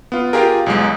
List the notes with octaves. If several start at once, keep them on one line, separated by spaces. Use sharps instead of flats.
B3 F4
F4 G4 G#4 A#4
B1 E2 G#3